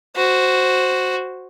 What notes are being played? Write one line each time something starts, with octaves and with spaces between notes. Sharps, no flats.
F#4 C5